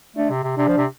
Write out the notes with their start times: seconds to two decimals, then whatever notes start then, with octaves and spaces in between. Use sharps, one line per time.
0.16 A3 D4
0.30 C3
0.44 C3
0.57 C3 D4
0.68 F3
0.77 C3